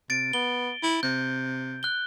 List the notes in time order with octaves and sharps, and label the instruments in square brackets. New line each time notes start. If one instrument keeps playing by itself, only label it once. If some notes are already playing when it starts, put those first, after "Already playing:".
[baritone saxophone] C3 [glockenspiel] A6 D7
[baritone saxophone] B3 [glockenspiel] G7
[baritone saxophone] E4
[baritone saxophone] C3 [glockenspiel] G6
[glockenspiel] F#6 G7